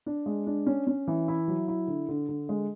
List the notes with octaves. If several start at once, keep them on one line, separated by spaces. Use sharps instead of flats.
D4
G#3
D4
C#4
C#4
E3
E4
F#3
E4
D3
D3
D3
G#3